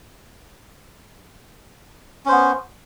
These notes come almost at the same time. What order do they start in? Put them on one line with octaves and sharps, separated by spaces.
C#4 C5 B3